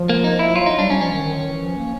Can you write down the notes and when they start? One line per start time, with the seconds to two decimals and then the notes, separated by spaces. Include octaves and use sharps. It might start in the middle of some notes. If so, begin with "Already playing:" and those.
Already playing: F3
0.09 A#3
0.24 D#4
0.39 E4
0.55 F#3 F4
0.66 D#4
0.78 G3 D4
0.90 C#4
1.01 F3 C#4
1.13 D#3
1.24 D#3
1.35 D#3
1.47 E3
1.62 F3
1.78 A#3